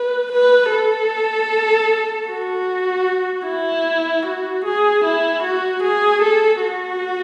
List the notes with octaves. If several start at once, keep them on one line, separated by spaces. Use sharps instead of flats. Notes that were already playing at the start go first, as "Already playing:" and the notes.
Already playing: B4
B4
A4
F#4
E4
F#4
G#4
E4
F#4
G#4
A4
F#4